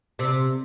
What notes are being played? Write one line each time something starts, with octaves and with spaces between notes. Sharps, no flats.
C3